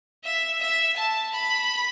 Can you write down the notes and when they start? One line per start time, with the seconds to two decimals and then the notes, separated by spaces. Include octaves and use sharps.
0.24 E5
0.60 E5
0.96 A5
1.32 B5